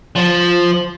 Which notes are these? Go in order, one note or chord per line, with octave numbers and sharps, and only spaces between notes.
F3